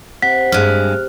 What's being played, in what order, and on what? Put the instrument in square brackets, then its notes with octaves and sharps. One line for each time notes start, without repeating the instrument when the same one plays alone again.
[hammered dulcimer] C3 [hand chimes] F#5 [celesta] B6
[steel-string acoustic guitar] G2 G#3 [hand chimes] F6 F#6